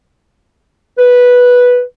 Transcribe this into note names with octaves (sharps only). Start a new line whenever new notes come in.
B4